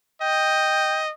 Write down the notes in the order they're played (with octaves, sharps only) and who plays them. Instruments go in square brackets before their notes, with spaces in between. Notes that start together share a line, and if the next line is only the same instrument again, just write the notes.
[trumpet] D#5 [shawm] G5